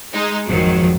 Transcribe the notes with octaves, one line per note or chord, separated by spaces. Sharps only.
G#3 D#4
G#1 F2 G#2 D#3 F3 F#3